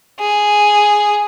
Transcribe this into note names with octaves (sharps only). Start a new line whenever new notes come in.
G#4